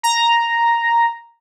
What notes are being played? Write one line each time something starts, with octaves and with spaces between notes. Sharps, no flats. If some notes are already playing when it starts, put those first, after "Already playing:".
A#5